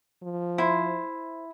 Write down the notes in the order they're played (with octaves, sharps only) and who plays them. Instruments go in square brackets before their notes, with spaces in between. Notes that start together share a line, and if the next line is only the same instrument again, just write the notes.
[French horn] F3
[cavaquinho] E4 [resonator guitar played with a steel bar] C5